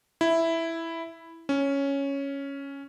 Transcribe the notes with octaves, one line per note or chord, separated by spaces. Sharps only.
E4
C#4